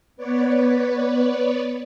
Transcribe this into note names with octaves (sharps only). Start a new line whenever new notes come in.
B3 B4 C#5 D5